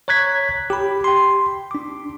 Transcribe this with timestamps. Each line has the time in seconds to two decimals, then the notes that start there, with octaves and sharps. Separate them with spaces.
0.08 C#5 A#5 F#6 G#6 B6
0.70 G4 B5
1.04 G5 C6
1.71 D4 D6